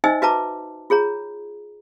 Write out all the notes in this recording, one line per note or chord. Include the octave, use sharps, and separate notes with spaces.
D#4 C5 D#5 E5 G#5 E6
F#4 B4 E5 A5 A#5 D6
F4 G#4 C#5 A#5